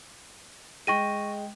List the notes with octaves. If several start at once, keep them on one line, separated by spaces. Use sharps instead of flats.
G#3 G5 C#6 A#6 D#7